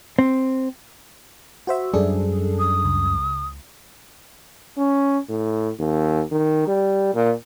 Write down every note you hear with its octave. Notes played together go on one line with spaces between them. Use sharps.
C4
F#4 C5 E5
F#2 G3 D4 G#4 A4
D#6
C#2
C#4
A2
D#2
D#3
G3
A#2